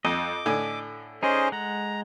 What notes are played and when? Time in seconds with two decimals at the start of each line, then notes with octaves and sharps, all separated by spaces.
0.05 F2 D#5 D6
0.46 A2 D3 G#5
1.23 C#4 D#4 G#4 C5 D5 D#5
1.52 G#3 F#5 A#5